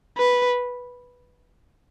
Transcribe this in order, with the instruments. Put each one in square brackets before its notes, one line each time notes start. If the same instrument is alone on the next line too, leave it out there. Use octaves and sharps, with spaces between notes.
[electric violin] B4